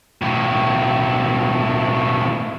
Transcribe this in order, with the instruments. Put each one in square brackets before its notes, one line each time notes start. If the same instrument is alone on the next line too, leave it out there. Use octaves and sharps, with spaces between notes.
[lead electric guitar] B1 A2